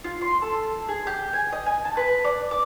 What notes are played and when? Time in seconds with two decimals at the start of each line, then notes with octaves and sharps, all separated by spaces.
0.04 F4
0.22 C6
0.42 A4
0.89 G#4
1.07 G4
1.33 G#5
1.52 D#5
1.66 G#5
1.85 A5
1.97 B4
2.25 D5
2.51 D6